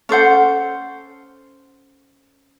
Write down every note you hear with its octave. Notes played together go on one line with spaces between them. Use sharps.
C#4 A4 C5 F#5